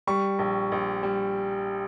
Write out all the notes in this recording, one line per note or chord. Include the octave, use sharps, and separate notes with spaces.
G3 C#6
A#1
A#1
G3